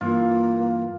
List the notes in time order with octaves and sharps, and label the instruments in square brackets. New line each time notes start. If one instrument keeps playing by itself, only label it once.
[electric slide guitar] G2 E3 [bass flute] A#3 [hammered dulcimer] F4